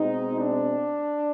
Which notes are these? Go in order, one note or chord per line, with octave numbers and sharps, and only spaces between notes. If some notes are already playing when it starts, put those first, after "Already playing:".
Already playing: B2 G#3 C4 D#4
D4